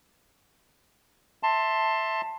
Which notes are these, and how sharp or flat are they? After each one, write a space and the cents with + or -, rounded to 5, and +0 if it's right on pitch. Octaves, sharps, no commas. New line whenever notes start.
E5 -10 A5 +15 C6 +10